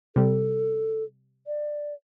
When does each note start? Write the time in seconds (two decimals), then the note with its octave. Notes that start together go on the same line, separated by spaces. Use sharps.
0.16 C3 G3 A4
1.47 D5